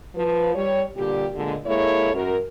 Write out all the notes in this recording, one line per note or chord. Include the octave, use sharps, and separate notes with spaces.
F3 B4
G3 C#5
A#2 D3 G3 G4
A#2 D3 G#3
G#3 A#3 E4 A4 C#5
F#2 A#4